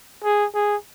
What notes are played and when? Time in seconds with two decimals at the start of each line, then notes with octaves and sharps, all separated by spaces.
0.24 G#4
0.55 G#4